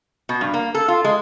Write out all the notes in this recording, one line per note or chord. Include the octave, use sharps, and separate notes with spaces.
B2
G2
A#3
A4
F4
G#3